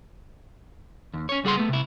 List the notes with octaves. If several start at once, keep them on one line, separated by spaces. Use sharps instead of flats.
D#2
C#4 C#5
C#2 G3 G#4 F#5 C6
A3 B3
C3 E4